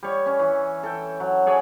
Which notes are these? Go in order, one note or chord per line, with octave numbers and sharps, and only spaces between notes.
G3 C#5
C#4
E3
A4 G5
F#3
G#4 C#5 D5 G#5